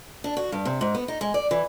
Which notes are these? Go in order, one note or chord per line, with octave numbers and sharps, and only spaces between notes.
D4
F#4
G2
C3
G#2
B3
D#4
G#3
D5
E3